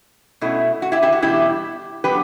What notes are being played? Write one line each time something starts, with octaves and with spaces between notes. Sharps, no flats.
B2 A3 C#4 E4
F#4
E4 G4
E4 G4
F#4
E2 B2 G3 E4 G4
F#3 B3 D4 G4 B4